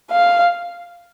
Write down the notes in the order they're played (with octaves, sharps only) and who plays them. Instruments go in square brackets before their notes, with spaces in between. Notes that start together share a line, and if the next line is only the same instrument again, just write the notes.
[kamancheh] F5